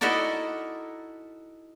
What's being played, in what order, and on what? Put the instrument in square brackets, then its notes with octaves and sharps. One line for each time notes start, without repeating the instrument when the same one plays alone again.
[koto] D#4 E4 F#4 A4 A#4 D5